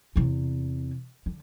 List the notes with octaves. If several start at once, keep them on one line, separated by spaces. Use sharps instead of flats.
E2 C3
D3